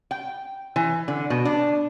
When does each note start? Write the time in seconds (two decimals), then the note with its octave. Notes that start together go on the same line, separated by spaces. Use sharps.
0.11 G5
0.76 E3
1.08 D3
1.30 B2
1.45 D4